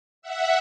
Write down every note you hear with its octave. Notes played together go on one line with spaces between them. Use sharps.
E5 F#5